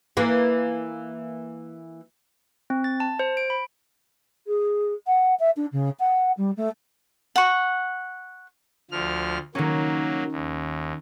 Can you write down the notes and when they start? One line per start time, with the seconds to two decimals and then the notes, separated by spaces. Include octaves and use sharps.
0.17 E3 A#3
2.70 C4
2.84 A6
3.00 A5
3.19 C5
3.37 D7
3.50 B5
4.47 G#4
5.07 F#5
5.39 E5
5.56 D4
5.72 C#3
5.99 F#5
6.37 G3
6.57 A3
7.36 F#5 C#6
8.91 D2 F3 F6
9.55 D#3 F#3 A#3 C#4
10.32 D#2